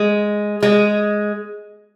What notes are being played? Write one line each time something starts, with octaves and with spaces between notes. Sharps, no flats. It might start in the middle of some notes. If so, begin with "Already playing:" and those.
Already playing: G#3
G#3